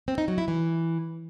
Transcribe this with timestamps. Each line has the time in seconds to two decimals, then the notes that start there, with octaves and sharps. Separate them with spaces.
0.08 C4
0.18 D#4
0.28 F#3
0.38 E4
0.48 E3